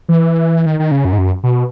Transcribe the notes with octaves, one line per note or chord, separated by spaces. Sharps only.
E3
D#3
D#3
C#3
F#2
G#2
F#2
B2